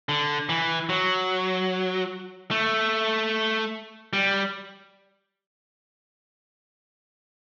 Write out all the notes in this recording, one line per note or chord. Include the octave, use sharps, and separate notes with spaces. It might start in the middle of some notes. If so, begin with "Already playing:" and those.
D3
E3
F#3
A3
G3